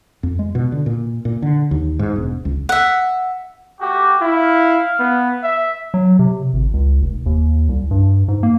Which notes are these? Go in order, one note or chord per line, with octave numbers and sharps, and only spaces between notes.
F2
G#3
B2
D3
A#2
A#2
D3
D#2
G#2
E1
C#2
E5 F#5
A3 F#4 G4
E4 F5
B3
E5
F#3
C3
G#1
C#2
F1
D#2
C2
G2
G#2
A#3